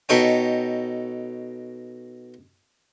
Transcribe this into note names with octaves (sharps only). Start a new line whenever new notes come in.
B2 D#4 A4 C#5 G5